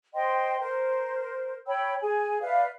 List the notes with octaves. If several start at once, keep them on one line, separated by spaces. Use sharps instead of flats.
C5 D#5 G5 C6
A#4 C5
C#5 G5 B5 E6
G#4 G#5
B4 D5 E5 F5